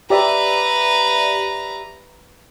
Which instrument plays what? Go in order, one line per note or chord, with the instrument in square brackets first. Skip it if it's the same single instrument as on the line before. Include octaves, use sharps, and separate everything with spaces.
[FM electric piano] G4 D5 E5 [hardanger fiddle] B4 A#5